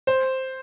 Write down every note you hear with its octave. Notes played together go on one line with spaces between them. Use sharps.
C5